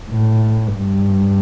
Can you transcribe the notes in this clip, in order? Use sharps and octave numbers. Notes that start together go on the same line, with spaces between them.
A2
G2